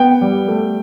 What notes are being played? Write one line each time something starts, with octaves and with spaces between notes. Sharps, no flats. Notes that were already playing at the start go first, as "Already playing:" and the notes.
Already playing: B3 G5
G3
A3